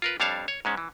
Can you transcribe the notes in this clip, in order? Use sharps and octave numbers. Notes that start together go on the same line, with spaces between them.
F4 A#4 B4
F2 G3 D4 C#5 F5 A5
C#5
G#2 G#3 C#4
E3